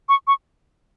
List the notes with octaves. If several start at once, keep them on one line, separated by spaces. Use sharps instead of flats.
C#6
C#6